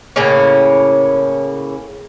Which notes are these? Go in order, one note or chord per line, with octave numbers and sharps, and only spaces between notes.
A2 C#3 A#3 C#4